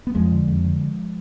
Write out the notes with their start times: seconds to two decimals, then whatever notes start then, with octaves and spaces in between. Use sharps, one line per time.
0.07 B3
0.15 F2 F3 G#3
0.32 D3
0.48 F2
0.64 D3